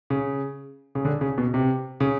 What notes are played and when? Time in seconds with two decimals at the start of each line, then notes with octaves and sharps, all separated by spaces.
0.10 C#3
0.95 C#3
1.05 D3
1.21 C#3
1.38 B2
1.54 C3
2.00 C#3